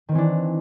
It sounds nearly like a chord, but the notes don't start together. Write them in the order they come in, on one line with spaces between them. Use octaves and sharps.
D#3 C4 E3 D4